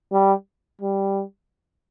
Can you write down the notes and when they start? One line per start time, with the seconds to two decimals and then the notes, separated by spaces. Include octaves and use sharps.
0.12 G3
0.81 G3